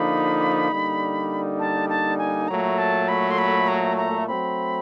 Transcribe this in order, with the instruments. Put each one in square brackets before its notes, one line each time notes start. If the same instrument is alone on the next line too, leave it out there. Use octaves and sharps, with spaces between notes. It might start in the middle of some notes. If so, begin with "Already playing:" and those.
Already playing: [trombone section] D3 F3 A#3 D#4 [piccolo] B5
[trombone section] D3 G3 A#3 D#4
[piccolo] A5
A5
G#5
[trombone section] A#2 F#3 A3 [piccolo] A#5
[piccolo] A5
B5
C6
B5
A#5
A#5
[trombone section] F#3 A3 C4 [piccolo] B5